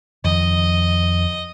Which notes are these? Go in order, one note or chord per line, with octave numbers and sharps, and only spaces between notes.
F2 D#3 F3 D#5